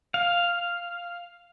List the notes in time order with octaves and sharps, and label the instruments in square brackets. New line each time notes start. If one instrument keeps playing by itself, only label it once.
[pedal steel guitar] F5